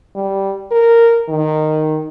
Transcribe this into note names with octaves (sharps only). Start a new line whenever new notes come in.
G3
A#4
D#3